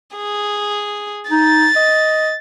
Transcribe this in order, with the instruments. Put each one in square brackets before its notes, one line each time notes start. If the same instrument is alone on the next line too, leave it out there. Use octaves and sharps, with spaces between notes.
[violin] G#4
[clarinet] D#4 [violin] A6
[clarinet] D#5